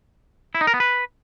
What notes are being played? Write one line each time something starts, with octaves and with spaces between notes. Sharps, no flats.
E4
D#4
A#4
B3
B4